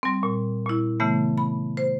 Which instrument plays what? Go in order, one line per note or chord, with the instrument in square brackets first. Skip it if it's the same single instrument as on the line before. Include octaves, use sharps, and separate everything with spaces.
[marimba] G3 C4
A#2
A#2 E4
C#3 E3 A3 B3
B5
C5